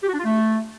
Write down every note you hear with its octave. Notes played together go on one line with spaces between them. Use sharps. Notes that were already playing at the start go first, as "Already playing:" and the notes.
G4
F#4
D4
F4
A3